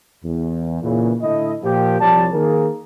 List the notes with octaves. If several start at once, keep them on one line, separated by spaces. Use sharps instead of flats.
E2
A#2 C#3 E3
A2 D3 E4 A4 D#5
A#2 F3 G4
C2 F3 G3 C#5 D5 A5
D#3 A#3 G#4 A#4